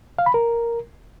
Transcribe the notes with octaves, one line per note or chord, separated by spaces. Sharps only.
F5
B5
A#4